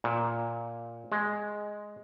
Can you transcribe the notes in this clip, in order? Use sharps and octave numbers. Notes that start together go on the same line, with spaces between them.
A#2
G#3